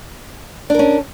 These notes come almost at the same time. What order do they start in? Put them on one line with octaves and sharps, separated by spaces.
D4 A#4 C#4